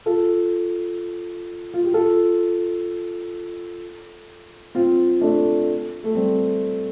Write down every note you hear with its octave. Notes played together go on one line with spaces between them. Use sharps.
F4 A4
F4
G4
F4 A4
C4 F4
A3 D4
A3
G3 C4